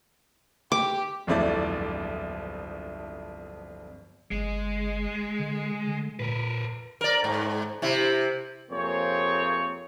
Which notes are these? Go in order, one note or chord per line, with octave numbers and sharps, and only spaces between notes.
G4 D6
D1 G1 F2 A3 E4 D5
G1 G#3
D3
D3
A#2 A#4 B4
A#4 D5
G#2
C3 E4
F2 C3 A#3 C4 G#4 C#5